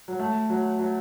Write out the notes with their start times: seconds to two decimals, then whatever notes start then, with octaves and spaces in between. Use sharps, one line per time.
0.08 F#3
0.19 A3
0.50 F#3
0.79 F#3